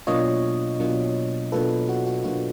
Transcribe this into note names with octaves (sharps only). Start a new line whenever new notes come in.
B2 F#3 A#3 D4 F4 C#5 D#5
B2 F#3 A#3 D4 F4
B2 F#3 A#3 D4 F4 A4 B4
F#4
F#4
B2 F#3 A#3 D4 F4 F#4